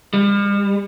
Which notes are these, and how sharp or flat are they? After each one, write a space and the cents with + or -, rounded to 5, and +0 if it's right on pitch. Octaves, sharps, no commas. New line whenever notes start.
G3 +45